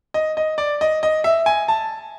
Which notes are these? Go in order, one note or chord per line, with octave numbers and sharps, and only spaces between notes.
D#5
D#5
D5
D#5
D#5
E5
G#5
A5